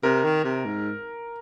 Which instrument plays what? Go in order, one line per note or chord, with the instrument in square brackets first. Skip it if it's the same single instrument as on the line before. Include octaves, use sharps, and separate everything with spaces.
[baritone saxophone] C3 [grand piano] A#4
[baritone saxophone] D#3
C3
G#2